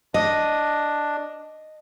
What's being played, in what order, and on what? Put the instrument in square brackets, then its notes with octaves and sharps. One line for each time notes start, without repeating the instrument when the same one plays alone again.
[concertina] D4 [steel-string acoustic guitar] D#5